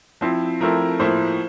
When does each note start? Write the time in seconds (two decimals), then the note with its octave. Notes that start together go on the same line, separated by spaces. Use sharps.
0.21 F3 C4 E4
0.60 F3 A3 C4 E4 A#4
1.00 A2 F3 A#3 E4 C5